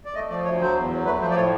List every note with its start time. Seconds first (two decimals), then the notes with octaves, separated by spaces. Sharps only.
0.05 D5
0.14 A3 D#5
0.29 F3 D5
0.45 D2 C#5
0.60 F#3 C5
0.76 E2
0.90 F#3
1.05 A3 B4
1.21 F3 C5
1.31 D5
1.36 A2 C#5